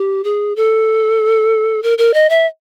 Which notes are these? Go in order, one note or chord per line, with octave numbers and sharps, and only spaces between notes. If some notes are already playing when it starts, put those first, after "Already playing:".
Already playing: G4
G#4
A4
A#4
A#4
D#5
E5